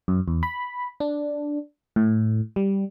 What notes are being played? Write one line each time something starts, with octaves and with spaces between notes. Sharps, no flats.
F#2
E2
B5
D4
A2
G3